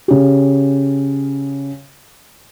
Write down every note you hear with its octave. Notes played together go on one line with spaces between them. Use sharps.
C#3 G4